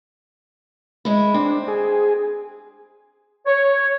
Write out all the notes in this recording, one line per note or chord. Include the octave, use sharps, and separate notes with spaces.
G#3 E4
C4 D4
G#4
C#5